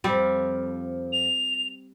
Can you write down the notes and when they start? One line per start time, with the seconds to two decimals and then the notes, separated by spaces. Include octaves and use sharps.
0.04 F2 F3 G3 C4
1.12 F7